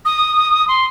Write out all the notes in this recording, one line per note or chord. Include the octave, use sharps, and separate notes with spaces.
D#6
C6